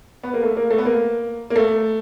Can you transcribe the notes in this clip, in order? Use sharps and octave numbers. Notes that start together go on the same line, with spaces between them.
B3
A#3
A3
A#3
A3
B3
A#3
A#3
A3